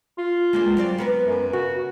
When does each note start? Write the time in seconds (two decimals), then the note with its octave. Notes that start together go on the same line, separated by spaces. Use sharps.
0.18 F4
0.53 G#3 A#3 D4
0.77 F#3 C4 D5
0.98 B3 A#4 B4
1.27 F#2
1.53 C#3 F#4